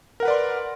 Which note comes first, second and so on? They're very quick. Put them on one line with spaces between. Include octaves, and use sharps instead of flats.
A#4 F#5 B4 D5 C6